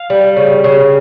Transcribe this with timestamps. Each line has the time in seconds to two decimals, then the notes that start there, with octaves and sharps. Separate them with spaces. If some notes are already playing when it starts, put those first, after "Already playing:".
Already playing: F5
0.10 G3
0.36 C#3
0.64 C#3